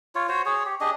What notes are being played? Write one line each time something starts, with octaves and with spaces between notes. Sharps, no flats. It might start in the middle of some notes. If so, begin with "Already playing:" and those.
F4 C#5
F#4 C5 C#5
G#4 C#5
G4
D4 G4 G#4 D#5